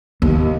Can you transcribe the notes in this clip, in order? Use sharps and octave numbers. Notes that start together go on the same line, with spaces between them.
D#2